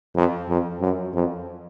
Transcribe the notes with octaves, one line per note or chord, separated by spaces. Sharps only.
F2
F2
F#2
F2